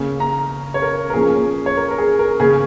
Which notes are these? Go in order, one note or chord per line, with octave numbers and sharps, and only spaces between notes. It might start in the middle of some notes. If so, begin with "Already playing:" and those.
Already playing: C#3 A#3 C#4
A#5
C#5
A#4
A#4
A#2 F3 A#3 C#4 G#4
C#5
A#4
A#4
G#4
A#4
C#3 A#3 C#4 G#4